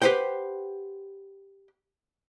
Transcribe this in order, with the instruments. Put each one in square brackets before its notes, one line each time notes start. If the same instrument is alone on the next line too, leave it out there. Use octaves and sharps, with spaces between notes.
[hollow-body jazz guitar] G4 B4 C5 F#5 G5